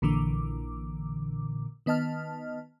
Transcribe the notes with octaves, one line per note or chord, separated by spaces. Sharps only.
A#1 A#2 D3 E3 D6
D#3 B3 D#5 A5 F6